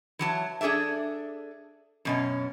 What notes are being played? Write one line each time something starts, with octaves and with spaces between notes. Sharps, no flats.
E3 F#3 A5
D4 G#4 A4 D5 E5
F#2 B2 C#4